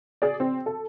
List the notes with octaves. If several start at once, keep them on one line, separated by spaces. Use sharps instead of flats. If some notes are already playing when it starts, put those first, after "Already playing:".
G#4 D5
C4
A4